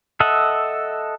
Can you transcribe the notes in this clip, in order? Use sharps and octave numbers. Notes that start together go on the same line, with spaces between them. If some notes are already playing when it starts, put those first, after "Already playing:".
A4 D#5 E5 F#5